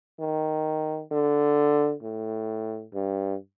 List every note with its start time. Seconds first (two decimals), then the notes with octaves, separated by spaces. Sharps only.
0.20 D#3
1.11 D3
2.03 A2
2.94 G2